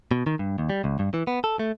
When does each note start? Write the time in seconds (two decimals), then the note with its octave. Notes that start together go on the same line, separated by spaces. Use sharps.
0.11 B2
0.27 D#3
0.39 G2
0.58 D#2
0.70 G3
0.84 C#2
0.99 G2
1.14 E3
1.27 B3
1.44 A4
1.59 A3